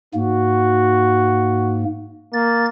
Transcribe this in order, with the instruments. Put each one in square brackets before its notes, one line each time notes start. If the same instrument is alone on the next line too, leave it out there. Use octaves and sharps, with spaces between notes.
[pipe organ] G#2 A#3 [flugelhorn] F#4
[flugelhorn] A#3 [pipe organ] A6